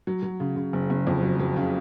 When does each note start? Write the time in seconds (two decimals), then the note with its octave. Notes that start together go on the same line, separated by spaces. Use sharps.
0.07 F#3
0.23 F#3
0.40 C#3
0.56 C#3
0.73 F#1
0.90 F#1
1.07 F2
1.23 F#3
1.39 F#3
1.56 C#3